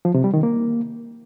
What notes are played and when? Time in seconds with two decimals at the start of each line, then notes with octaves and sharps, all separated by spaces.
0.05 F3
0.14 C3
0.24 G3
0.34 D#3
0.43 A#3